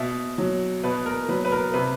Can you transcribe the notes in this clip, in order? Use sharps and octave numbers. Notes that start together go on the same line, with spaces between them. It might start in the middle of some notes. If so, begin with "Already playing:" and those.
Already playing: B2 E5
F#3
B2 B4
A#4
F#3 B4
B4
A#4
C3 B4